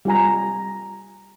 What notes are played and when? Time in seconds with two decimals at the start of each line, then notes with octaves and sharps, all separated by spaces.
0.05 G3 F4 G#5 A#5